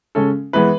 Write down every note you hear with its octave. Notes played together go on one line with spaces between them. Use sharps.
C#3 G#3 C#4 A4
E3 G#3 B3 B4